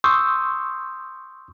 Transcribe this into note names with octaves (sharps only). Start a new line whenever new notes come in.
C6 C#6 D#6 E6 G6